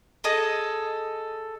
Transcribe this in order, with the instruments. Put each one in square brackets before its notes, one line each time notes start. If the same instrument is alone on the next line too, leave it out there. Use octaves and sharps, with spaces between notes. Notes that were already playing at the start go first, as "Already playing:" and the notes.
[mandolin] G#4 A4 D#5